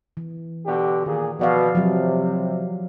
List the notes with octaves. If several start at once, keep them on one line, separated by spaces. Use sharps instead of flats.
E3
B2 D3 G4
A#2 D#3 G#4
B2 F3 D5 F5
C3 F3 F#3